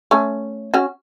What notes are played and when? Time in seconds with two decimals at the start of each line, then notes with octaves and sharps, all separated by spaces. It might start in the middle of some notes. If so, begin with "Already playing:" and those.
0.11 A3 C#4
0.74 C#4 F#4